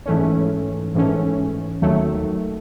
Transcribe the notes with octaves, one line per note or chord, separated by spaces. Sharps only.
G#2 E3 A3 C#4
G#2 E3 A3 C#4
D#2 D#3 F#3 A3